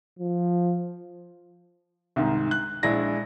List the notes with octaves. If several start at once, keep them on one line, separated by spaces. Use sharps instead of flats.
F3
C2 G#2 D#3
F#6
A#1 G#3 D4 E4 A#6